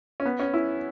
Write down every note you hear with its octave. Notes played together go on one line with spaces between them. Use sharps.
C#4
B3
C#4
E4